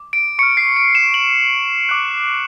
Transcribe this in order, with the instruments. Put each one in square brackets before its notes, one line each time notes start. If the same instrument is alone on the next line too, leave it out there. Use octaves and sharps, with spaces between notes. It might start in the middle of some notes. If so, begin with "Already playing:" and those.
Already playing: [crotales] D6
D7
C#6 C#7
F6
C7
D7
E7
F#7
D6 F#6